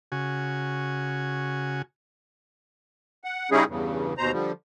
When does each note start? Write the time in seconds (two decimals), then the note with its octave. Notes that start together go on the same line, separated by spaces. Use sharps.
0.12 C#3 F#4 G#5
3.24 F#5
3.51 C#3 G3 C#4 D#4 E4 G#4
3.68 E2 G2 C#3
4.18 D#2 B2 C5 A#5
4.32 D3 F3 G3